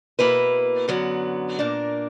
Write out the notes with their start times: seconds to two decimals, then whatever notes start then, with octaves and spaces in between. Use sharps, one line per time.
0.19 B2 A#3 E4 B4
0.88 F#2 D3 F#3 B3
1.58 A#2 A#3 D4 A#4